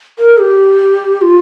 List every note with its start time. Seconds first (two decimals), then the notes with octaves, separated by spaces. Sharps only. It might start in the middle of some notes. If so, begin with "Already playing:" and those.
0.19 A#4
0.40 G4
1.22 F4